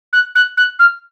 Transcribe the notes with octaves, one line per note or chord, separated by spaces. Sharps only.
F#6
F#6
F#6
F6